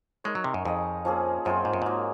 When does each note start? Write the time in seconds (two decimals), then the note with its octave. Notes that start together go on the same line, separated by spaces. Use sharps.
0.24 G#3 D#4 A#4 C#5
0.35 F#3
0.44 C3
0.54 F#2
0.65 F2 D#4 G#4 D#5
1.05 F3 A#3 C#4 G#4
1.45 F#2 C4 F4 G#4 C5
1.65 G#2
1.73 F#2
1.82 G#2 F#3 A#3 D#4